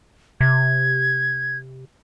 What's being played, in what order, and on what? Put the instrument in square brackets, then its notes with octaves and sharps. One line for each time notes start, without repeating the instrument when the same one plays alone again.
[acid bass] C3 [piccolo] G#6